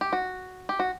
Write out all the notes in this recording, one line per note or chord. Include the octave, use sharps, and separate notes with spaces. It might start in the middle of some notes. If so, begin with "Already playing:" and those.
G4
F#4
G4
F#4